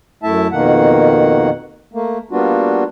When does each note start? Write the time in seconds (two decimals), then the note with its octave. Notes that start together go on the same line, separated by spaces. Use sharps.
0.23 F#2 A3 E4 E5 A5
0.52 F2 B2 D#3 A#3 F#5
1.94 A3 A#3
2.31 G3 A#3 B3 D4 F4 F#4